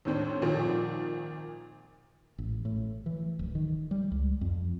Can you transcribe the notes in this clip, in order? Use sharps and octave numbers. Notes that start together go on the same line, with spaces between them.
D#2 A2 C4 D4
G#1 A#2 D#3 F3
A1
A2
E3
D1
D#3
G3
C#2
F2